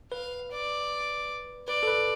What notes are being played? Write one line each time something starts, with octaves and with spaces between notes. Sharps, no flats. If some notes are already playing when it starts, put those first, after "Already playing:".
B4 F5
D5
B4 D5
A4
B4